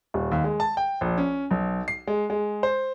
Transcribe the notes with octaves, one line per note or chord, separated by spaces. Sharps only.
D#1
D#2
G#3
A5
G5
A#1
C#4
B1
C7
G#3
G#3
C5